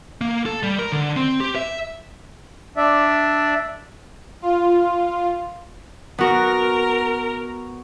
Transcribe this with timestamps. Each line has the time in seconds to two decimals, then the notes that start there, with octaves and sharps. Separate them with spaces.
0.21 A#3
0.46 A4
0.63 G3
0.79 A#4
0.92 D3
1.16 C4
1.40 G4
1.55 E5
2.77 D4 D5 E5
4.42 F4
6.18 B3 F#4 A#4